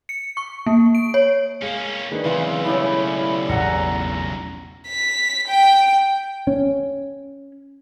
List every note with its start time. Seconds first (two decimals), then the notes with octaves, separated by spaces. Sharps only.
0.09 C#7
0.37 C#6
0.66 A#3
0.95 D7
1.14 C#5
1.62 G#3 A#3 C#4 F5
2.11 D#3 G#3 D4 B4
2.24 B1 C#3 E3 C4 F4
2.65 A2 G3 C#4 E4
3.49 A1 E2 E5 F#5 G#5 A#5 C#7
4.87 B6
5.48 G5
6.47 C#4